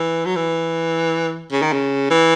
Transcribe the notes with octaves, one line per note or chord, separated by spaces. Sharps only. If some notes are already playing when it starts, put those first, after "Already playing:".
Already playing: E3
F#3
E3
C#3
D#3
C#3
E3